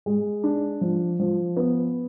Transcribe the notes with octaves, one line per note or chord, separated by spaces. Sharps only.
G#3
D4
F3
F3
B3